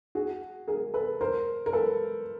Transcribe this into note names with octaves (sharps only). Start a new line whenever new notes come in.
F#4 G#4
G#4 A#4
A4 B4
A#4 C5
A#4
A4 B4